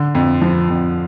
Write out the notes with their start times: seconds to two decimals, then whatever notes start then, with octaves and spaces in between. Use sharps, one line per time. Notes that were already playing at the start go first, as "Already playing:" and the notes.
Already playing: D3
0.15 F2
0.42 F3
0.70 F2